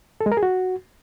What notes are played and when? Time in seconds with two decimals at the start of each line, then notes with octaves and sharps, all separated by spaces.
0.21 A4
0.26 G#3
0.32 A#4
0.37 G#4
0.43 F#4